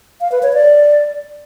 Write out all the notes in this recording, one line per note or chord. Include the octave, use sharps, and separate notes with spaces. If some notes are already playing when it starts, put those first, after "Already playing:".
F5
B4
C#5
D5